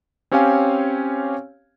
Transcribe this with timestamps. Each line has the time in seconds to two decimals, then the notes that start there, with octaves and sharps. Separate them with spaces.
0.31 C4 C#4 G4 C#5 F5 G#5